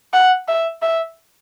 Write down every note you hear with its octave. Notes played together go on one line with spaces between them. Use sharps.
F#5
E5
E5